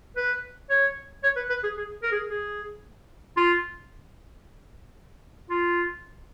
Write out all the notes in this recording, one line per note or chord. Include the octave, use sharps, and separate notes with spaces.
B4
C#5
C#5
B4
B4
G#4
G#4
A#4
G#4
G#4
F4
F4